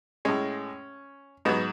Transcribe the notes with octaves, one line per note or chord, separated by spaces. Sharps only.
A2 G#3 C#4
G#2 F#3 B3